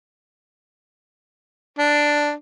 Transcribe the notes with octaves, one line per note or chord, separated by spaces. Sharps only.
D4